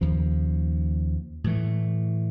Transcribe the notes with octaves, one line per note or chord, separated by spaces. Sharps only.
D#2 C#3 F3
A2 E3 A3